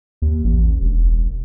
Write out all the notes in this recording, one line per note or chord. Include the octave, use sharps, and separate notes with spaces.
D#2
A1
E1